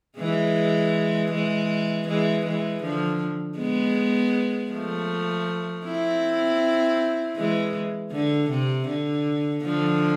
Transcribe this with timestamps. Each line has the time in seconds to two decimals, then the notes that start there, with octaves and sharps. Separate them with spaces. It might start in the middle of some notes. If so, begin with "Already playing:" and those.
0.18 E3 G#3
1.31 E3 G#3
2.07 E3 G#3
2.45 E3 G#3
2.82 D3 F3
3.58 G#3 B3
4.71 F3 A3
5.85 C4 E4
7.37 E3 G#3
8.11 D3
8.49 C3
8.88 D3
9.63 D3 F3